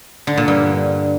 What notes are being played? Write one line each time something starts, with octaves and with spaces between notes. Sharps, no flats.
D3
A#2
G2